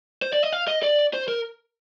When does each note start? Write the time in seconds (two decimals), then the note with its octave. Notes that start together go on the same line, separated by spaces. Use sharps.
0.22 C5
0.33 D5
0.43 D#5
0.52 F5
0.67 D#5
0.83 D5
1.14 C5
1.28 A#4